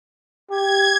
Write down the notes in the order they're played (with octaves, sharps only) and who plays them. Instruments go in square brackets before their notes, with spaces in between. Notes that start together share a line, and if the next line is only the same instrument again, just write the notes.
[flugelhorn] G4 [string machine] G#6